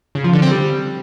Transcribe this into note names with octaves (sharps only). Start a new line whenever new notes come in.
C#3
F3
D3
C4
G3